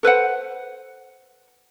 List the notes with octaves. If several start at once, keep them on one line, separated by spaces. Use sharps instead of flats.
A4 B4 C5 F#5